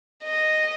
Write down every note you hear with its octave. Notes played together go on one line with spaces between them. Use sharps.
D#5